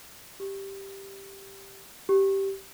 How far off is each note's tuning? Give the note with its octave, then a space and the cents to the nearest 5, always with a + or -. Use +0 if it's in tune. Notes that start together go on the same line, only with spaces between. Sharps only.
G4 +0
G4 -10